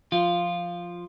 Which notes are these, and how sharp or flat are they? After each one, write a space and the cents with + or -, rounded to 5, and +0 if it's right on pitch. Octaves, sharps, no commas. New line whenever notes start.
F3 +5 F4 +0